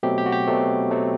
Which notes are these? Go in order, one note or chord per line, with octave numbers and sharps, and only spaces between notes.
B2 F#3 A3 C4 G4
G4
F#4
G4
B2 F#3 A3 C4
B2 F#3 A3 C4